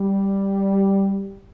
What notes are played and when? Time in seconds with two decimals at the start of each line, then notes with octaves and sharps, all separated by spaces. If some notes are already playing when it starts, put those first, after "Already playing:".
Already playing: G3